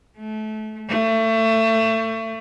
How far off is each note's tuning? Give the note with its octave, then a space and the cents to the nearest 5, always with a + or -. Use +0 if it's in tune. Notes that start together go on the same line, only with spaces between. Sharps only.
A3 -25
A3 +30